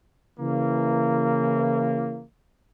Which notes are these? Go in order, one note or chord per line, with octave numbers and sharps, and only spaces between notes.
C#3 E3 A#3